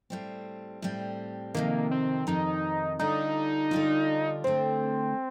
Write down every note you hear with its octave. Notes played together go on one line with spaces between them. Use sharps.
A2 G3 C4
A2 G3 C4
F2 C3 D#3 A#3
C4
F2 C3 D#3 D#4
D3 G3 D4 D#4 F4
D3 G3 D4 F4
D2 D3 A3 C4